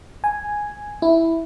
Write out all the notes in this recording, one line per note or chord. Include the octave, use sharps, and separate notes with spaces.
G#5
E4